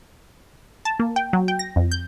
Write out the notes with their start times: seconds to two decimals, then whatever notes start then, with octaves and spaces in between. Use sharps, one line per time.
0.85 A5
0.99 A#3
1.16 G5
1.33 F#3
1.48 G5
1.59 A#6
1.76 F2
1.92 G6